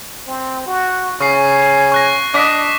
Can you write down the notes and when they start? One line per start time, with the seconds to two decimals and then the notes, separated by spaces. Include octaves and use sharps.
0.27 C4
0.66 F#4
1.21 C#3 G#5 C#6 C7
1.92 C#6 F#6 A#6
2.34 D4 D#5 D6 B6